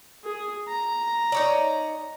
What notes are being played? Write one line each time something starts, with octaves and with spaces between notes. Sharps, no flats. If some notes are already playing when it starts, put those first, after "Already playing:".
G#4
A#5
D#4 C#5 D5